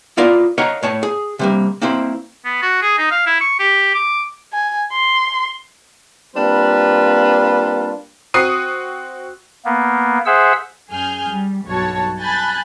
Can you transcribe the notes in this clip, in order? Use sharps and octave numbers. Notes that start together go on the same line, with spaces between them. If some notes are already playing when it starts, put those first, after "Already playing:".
B3 E4 F4 A#4 D5
A#4 C#5 D#5 F5 F#5 A#5
A2 C#5 A5
G#4
C3 G3 A#3
A#3 C4 E4 C5
B3
F#4
G#4
D#4
F5
E4
C#6
G4
D6
G#5
C6
G3 A#3 C4 D4 F4 B4
C4 F#4 D#6 C7 D#7
A#3 B3
G#4 C5 E5 F#5 E6
F#2 G#4 G#5 F6 G6
G3
B1 G2 F#4 C#5 A5
G#5 A5 B5 F#6 G6 A6